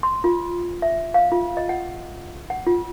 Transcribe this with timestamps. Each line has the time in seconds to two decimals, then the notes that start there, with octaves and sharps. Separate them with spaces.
0.03 C6
0.24 F4
0.82 E5
1.14 F5
1.32 F4
1.57 D#5
1.69 F#5
2.50 F#5
2.67 F4